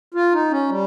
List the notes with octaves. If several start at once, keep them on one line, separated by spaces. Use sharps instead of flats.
F4
D#4
C#4
G3